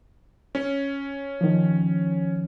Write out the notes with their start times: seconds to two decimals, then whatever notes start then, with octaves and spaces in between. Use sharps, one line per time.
0.55 C#4
1.41 D#3 F3